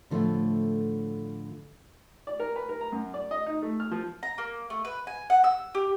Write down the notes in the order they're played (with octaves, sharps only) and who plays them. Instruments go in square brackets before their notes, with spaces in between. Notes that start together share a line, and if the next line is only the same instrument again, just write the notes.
[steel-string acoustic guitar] A2 D3 F3 G3 A3
[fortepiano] D5
A#4
B4
A#4
A#5
F#2
D5
D#5
D#4
A3
F6
F3
[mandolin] A#5
A#3
A3
B4
G#5
F#5
E6
G4